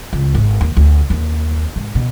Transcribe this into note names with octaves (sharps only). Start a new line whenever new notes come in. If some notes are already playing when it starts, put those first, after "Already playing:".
C#2
G#1
D#2
D2
D#2
G#2
B2